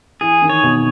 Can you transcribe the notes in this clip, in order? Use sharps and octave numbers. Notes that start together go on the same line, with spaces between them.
E3 G#4
D#3
C#5
B2